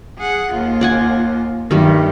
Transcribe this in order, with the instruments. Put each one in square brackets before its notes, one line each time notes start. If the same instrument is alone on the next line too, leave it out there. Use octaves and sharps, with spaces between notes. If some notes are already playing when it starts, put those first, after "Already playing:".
[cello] G#4 F#5
D#2 F4
[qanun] D5 F#5 G#5
[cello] G2 A3 [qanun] D#3 G3